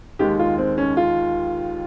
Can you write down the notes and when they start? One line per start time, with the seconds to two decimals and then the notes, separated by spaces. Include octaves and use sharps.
0.19 D#2 D#3 G#3 G4
0.39 F4
0.58 C4
0.78 C#4
0.97 F4